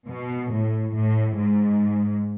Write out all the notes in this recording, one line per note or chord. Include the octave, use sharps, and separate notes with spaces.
B2
A2
A2
G#2